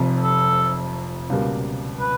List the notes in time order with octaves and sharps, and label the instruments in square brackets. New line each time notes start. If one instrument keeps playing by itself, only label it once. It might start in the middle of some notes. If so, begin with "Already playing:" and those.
Already playing: [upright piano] F1 F2 C3
[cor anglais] A4
[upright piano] C#2 B2 G3 A#3
[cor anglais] B4